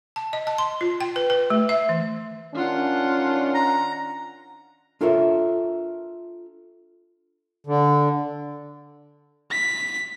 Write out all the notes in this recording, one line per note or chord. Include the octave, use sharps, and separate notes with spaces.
A5
D#5
A5
C6
F4
G5
B4
B4
A3
E5
E3
D#3 C#4 D4 F4 F#5
A#5
D4 F4 A4 A#4 C#5 E5
D3
B6